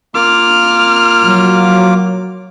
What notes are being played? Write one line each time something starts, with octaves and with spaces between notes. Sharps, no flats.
A#3 F4 D6 F6
F#3